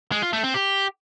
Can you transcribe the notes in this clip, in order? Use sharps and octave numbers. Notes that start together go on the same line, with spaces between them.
G#3
F4
A3
C4
G4